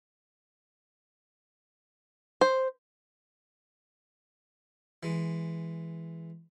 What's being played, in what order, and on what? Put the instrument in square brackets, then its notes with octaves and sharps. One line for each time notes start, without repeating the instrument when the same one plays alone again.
[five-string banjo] C5
[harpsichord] E3 G#3